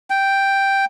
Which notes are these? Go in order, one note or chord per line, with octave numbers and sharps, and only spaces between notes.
G5